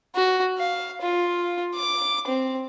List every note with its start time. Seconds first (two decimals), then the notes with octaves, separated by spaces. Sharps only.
0.15 F#4
0.59 F5
1.02 F4
1.75 D6
2.28 C4